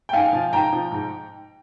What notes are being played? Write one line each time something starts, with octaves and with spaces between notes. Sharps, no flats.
G5
G#2 F5 G#5
F3
G#2 G5 A#5
F3
G#2